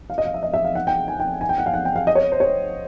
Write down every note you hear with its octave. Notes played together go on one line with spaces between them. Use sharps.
F5
D#5
F5
E5
D#5
E5
F5
F#5
G5
G#5
G5
G#5
G5
F#5
F5
F#5
G5
F5
D#5
C#5
C5
C#5